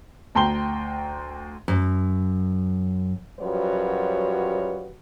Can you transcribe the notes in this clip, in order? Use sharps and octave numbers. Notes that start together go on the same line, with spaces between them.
D2 G5 A#5 C6 G6 G7
F#2
F#2 F3 G3 F#4 B4 C#5